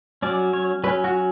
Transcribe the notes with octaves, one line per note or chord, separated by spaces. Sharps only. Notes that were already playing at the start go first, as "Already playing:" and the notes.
F#3 C#4 D5
C#5
F#3 C#4 B4
F#4